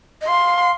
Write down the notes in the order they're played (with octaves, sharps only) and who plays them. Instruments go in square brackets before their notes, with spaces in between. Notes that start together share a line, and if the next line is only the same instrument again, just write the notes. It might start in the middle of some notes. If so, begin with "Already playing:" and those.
[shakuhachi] D#5
[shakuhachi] F5 [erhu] C6